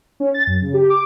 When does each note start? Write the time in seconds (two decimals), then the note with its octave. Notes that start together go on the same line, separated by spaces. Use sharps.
0.20 C#4
0.34 A6
0.47 F#2
0.62 C#3
0.74 G4
0.90 D6